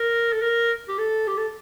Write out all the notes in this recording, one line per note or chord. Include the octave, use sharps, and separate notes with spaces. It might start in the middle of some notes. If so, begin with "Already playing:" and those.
Already playing: A#4
A4
A#4
G4
A4
G4
A4